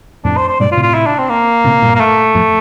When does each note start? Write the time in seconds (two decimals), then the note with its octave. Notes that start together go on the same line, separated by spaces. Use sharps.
0.24 F2 A2 D4
0.37 C5
0.48 C5
0.60 G2 A#2 D5
0.72 F4
0.77 A2 C3
0.83 F4
0.95 E4
1.06 D4
1.18 C4
1.29 A#3
1.64 A2 C3
1.82 G2 A#2
1.95 A#3
2.00 A3
2.35 F2 A2